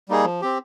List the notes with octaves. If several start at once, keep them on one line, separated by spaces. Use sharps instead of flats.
G3 A#3 D#4 G#4
F3
C4 G4